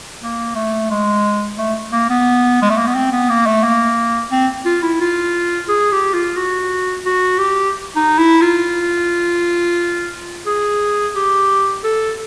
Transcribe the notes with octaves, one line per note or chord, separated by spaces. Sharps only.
A#3
A3
G#3
A3
A#3
B3
G#3
A3
A#3
B3
C4
B3
A#3
A3
A#3
C4
F4
E4
F4
G#4
G4
F4
F#4
F#4
G4
D#4
E4
F4
G#4
G4
A4